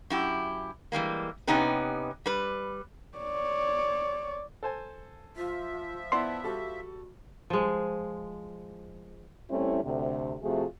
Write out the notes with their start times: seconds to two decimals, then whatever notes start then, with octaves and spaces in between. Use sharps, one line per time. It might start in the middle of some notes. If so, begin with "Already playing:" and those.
0.10 F#2 E4 G4
0.92 E3 G3 G#3 A#3
1.47 C3 B3 C#4 D#4 G4 B4
2.26 G3 B4
3.17 C#5 D5
4.63 A4 C5 G#5
5.37 F3 F4 E5
6.12 B3 E4 D5 A5 C6
6.44 G3 F#4 A4
7.50 F3 G#3
9.50 G3 A3 C4 C#4 E4
9.84 D2 C3
10.43 C3 F3 A3 F4 F#4 G#4